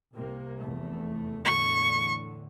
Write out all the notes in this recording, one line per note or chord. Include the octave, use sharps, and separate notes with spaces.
C2 C3 A#3
F1 E2 A3
E2 A2 D3 C#6